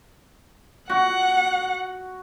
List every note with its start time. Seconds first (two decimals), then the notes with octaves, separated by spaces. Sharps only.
0.89 F#4 F#5